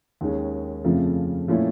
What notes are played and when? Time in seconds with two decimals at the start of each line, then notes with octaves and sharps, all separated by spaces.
0.21 D#2 D#3 G#3 C#4
0.84 F2 C#3 F3 A3
1.48 A#2 F3 A3 C#4 E4